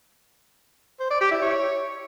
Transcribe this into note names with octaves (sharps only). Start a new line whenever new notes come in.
C5
D5
G4
E4
C#5